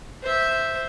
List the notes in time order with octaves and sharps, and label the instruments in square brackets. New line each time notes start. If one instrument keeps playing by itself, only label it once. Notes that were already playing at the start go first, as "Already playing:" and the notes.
[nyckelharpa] C5 E5